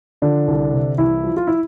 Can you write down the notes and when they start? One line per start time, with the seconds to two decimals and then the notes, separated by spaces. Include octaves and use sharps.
0.22 D3 F3 D4
0.48 C2
0.73 C3
0.98 C2 E3 E4
1.24 F3
1.37 F4
1.47 E4